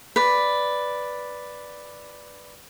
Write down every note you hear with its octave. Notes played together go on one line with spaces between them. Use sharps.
B4 D5